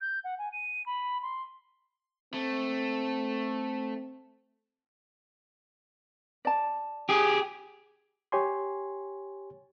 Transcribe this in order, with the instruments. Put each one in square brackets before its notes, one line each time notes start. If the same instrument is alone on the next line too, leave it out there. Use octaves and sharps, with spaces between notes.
[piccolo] G6
F#5
G#5
D#7
B5
C6
[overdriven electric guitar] A3 [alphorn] C4
[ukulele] D5 A5
[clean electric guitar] G4 G#4
[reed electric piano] G4 C#5 G#5 C6